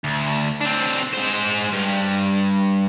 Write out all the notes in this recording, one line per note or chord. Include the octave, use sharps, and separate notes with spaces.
D2
C4 D4
G#3 C5
G2